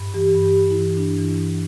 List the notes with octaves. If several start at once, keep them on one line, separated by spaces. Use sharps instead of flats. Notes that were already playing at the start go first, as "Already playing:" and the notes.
Already playing: G2
E3 G4
G2
G4
G2
E4
E3
G2 D4
E3
E3